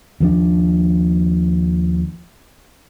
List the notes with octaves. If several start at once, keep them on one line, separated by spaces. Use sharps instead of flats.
D#2 F3 D4